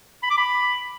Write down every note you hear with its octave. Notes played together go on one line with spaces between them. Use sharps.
B5
D6
B5